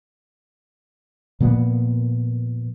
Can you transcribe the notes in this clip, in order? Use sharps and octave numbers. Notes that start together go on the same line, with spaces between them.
A#2 F3 A#3 B3